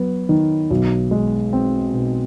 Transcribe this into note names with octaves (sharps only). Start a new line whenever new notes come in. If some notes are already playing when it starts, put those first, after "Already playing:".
Already playing: F#3 B3
D#3
B1
G#3
C4
B2